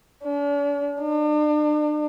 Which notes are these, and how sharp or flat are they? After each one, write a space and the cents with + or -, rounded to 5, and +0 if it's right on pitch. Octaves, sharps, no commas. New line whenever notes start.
D4 -45
D4 +40